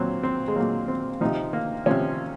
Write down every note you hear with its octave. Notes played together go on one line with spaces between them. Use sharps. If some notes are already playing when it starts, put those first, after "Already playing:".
Already playing: A#2 F#3 C4
C4
G#3
A#2 F#3 A#3
C4
C3 F3 D#4
A#3
C3 F3 C#4